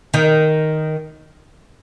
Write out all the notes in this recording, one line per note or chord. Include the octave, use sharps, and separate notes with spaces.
D#3